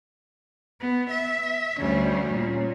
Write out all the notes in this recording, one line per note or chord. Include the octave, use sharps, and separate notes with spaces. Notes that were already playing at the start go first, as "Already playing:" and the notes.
B3
E5
D2 G3 C#4
A#2